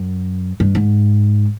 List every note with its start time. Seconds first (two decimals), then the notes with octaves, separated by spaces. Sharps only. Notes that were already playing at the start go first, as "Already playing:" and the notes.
Already playing: F#2
0.60 G2
0.75 G#2